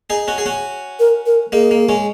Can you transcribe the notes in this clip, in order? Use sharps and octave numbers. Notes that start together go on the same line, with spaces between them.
D#4 G#4
C#4 F#4
G#4
C#4 F#4
A#4
A#4
A#3 D#4 G#4
A#3
G#3 C#4